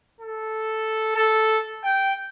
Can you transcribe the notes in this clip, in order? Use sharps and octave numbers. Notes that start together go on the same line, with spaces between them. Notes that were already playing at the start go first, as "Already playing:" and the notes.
A4
A4
G5